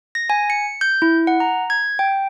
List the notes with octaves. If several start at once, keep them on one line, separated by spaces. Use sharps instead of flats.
A#6
G#5
C#7
G6
E4
F#5
A#5
G#6
G5